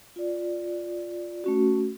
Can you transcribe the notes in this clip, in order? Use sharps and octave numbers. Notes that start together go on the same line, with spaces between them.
F4 D5
A3 C#4 F#4